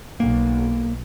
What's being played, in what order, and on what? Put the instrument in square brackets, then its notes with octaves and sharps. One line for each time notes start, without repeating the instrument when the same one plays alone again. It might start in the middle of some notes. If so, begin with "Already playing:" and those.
[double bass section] B1 [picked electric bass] A#3